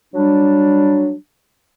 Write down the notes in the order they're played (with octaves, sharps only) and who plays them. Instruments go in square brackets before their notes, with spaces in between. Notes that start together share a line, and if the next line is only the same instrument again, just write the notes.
[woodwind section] F#3 G3 D4